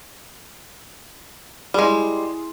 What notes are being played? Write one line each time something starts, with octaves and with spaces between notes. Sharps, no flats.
G3 G#3 E4 G#4 C6